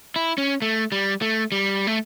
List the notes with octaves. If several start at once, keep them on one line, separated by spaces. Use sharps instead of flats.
E4
C#4
A3
G3
A3
G3
A3